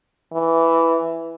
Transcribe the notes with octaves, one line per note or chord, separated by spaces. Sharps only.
E3